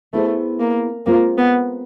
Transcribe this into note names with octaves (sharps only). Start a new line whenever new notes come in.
A3 B3 E4 G#4 C5
A#3
G#3 A#3 C4 F4
B3